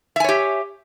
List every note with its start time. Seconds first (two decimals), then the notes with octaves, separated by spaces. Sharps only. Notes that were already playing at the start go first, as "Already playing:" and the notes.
0.16 E5
0.20 G#5
0.24 C#5
0.29 G4